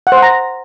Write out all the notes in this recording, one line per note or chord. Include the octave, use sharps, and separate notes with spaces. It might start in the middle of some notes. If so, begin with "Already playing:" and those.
F#5
C5
F#5
A#5